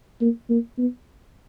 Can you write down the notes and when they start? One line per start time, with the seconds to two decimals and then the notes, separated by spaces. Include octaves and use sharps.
0.21 A#3
0.50 A#3
0.78 B3